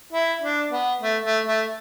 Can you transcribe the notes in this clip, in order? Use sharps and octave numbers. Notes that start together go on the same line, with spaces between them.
E4
D4
B3
A3
A3
A3